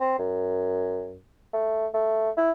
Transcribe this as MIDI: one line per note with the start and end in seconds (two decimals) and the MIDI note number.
0.01 0.18 60
0.19 1.18 42
1.53 1.87 57
1.94 2.30 57
2.37 2.51 64